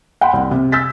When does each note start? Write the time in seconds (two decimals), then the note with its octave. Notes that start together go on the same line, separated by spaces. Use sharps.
0.21 F#5 G5 B5 C6
0.33 C2
0.51 C3
0.72 E6 G6 A6 B6